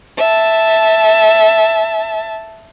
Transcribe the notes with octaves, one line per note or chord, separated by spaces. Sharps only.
E5 A5